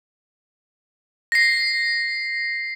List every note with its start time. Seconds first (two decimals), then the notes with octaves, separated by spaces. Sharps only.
1.32 A#6 C7